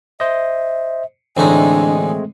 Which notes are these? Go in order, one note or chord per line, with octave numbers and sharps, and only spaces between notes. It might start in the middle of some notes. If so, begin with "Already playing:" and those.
C5 D#5 E5
A1 D3 G#3 A3 C4 D4 D#4 G#5